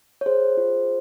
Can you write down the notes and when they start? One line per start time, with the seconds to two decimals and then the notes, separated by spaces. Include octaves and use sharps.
0.21 C#5
0.26 G#4 C5
0.57 F4